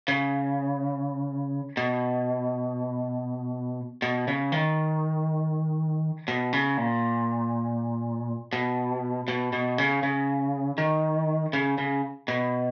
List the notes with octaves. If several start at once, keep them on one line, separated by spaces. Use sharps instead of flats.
C#3
B2
B2
C#3
D#3
B2
C#3
A#2
B2
B2
B2
C#3
C#3
D#3
C#3
C#3
B2